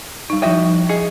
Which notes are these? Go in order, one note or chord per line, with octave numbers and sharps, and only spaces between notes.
G3 D#4
F3 E4 F#4 E5 G5
G#4 D#5